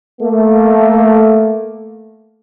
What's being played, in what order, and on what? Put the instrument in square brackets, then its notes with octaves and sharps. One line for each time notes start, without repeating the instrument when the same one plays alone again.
[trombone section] A3 A#3